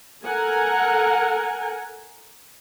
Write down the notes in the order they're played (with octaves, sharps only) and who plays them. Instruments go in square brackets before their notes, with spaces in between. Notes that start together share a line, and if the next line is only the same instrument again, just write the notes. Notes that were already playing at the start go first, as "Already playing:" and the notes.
[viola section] A4 A#4 F#5 G#5